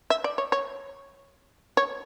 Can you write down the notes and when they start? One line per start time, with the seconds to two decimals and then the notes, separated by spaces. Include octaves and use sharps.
0.10 E5
0.24 D5
0.38 C#5
0.52 C#5
1.77 C#5